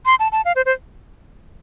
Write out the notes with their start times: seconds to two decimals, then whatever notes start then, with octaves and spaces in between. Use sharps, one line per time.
0.06 C6
0.20 A5
0.32 A5
0.45 F5
0.56 C5
0.66 C5